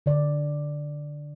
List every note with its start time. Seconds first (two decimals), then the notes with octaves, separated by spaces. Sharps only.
0.06 D3 D5